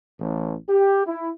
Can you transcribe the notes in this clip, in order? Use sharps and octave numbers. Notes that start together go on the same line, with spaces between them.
A1
G4
E4